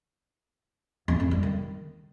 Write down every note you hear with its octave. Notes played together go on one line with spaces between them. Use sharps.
E2
F2
G3
D#3